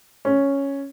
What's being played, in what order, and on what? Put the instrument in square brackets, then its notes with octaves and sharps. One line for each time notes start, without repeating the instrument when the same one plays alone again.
[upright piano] C#4